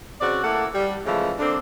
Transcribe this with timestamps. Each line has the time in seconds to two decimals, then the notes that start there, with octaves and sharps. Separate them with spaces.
0.21 C#3 C4 F#4 D5
0.44 A3 A#3 E4 A4 F#5
0.75 G3
1.06 C#3 E3 F3 G#3 A3
1.39 D3 A#3 C4 D4